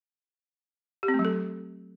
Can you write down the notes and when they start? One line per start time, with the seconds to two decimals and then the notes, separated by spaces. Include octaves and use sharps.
1.03 G4
1.08 C4
1.14 A3
1.19 F#3
1.25 A4